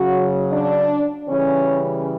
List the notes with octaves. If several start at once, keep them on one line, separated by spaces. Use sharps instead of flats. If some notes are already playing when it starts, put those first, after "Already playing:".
Already playing: C#3 F#3 F#4
D4
C#3 E3 G3 C#4